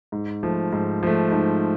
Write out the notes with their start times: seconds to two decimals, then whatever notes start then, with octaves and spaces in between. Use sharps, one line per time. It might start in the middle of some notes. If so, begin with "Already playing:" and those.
0.12 G#2
0.43 F3 A3
0.72 G#2
1.03 F3 A3
1.32 G#2